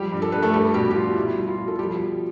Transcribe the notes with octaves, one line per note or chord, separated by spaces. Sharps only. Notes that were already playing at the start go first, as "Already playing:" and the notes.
Already playing: F3 G3 G4
G2
A4
G2 B4
A3 A4
G3 G4
B2 G3 G4
G4
B2 F4
B2 E4
G3
F4
B2
A4
F3 G3 G4
F3